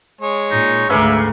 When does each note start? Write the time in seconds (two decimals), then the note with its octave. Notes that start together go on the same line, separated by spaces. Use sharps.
0.21 G#3 C#5
0.51 A#2 D#4
0.89 D2 G#2 C#3 A3 A#3 B4 E5